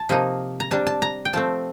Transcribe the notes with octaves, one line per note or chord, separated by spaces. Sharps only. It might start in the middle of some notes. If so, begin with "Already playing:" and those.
Already playing: A5
C3 F3 A#3 D#4
A#5
C3 G3 D4 A5
A5
A#5
G5
F3 A3 C4 A5